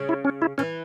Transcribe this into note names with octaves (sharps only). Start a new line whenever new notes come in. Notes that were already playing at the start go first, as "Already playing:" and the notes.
Already playing: C#3
E4
C#4
E4
E3 C#4